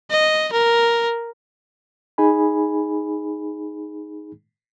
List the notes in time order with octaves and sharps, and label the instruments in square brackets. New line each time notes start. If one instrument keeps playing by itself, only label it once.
[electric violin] D#5
A#4
[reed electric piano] D#4 G#4 G#5 B5